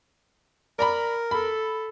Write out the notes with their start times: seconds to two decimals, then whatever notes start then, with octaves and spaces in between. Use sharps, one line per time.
0.79 A#4 D5 A#5 B5
1.31 A4 B5